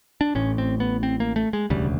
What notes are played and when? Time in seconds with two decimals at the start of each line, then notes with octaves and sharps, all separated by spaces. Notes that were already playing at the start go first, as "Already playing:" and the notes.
0.21 D4
0.35 A1 A2 C#4
0.58 C4
0.80 B3
1.03 C4
1.20 A#3
1.36 A3
1.53 G#3
1.70 E1 D2 C#3 G3